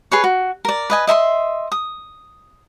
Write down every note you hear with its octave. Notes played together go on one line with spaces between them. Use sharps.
G#4 B4 C#5
F#4
A#4 D5
B4 D#5 G#5
D#5 E5 B5 C6
D#6